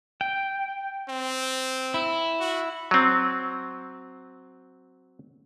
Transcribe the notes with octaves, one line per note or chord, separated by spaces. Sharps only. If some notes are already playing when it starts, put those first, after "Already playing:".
G5
C4
E4
F#4
F#3 C4